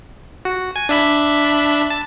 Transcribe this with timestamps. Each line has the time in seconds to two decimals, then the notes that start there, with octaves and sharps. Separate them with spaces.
0.45 F#4
0.76 G#5
0.89 D4 E5 B5
1.90 A5